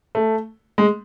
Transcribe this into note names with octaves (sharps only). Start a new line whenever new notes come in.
A3
G#3